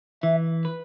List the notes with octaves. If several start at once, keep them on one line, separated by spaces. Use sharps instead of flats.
E3 E5
B4